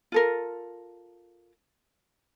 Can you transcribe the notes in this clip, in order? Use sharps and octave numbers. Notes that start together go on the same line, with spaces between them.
F4 A4 A#4